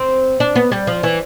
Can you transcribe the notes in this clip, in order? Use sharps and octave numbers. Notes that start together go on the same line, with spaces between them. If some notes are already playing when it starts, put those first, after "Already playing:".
Already playing: C4
D4
B3
G3
F3
E3